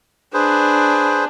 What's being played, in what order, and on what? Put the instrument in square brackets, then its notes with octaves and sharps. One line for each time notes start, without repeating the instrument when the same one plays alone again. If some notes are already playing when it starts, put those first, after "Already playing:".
[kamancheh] D4 [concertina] G#4 B4 C5